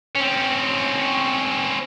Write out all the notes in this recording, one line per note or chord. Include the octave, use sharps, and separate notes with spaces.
C4 C#4